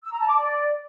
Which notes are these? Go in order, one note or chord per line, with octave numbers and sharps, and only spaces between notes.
E6
A#5
A5
D6
D5